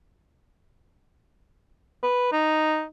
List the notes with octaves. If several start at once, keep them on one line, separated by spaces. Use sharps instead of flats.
B4
D#4